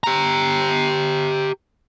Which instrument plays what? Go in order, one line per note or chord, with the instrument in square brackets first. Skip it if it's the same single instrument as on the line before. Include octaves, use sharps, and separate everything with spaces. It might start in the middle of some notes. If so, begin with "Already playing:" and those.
[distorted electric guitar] G4 A#5